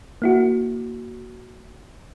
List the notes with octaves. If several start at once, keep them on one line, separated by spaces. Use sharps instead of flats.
A#3 E4 F#4